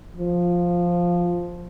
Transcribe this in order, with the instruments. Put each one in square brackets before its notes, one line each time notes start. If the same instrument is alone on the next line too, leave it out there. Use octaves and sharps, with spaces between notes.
[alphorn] F3